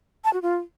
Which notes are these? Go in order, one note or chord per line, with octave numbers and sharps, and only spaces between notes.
A5
F#4
F4